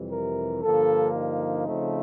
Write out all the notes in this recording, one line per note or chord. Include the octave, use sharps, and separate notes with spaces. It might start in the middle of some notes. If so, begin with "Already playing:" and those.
Already playing: F2 C3 E3 G3
A#4
G2 D3 F3 A#3 A4
D#4
C#3 F3 A3 C4